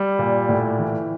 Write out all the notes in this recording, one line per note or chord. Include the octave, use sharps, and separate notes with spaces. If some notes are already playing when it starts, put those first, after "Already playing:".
Already playing: G3
A#2
A2
E3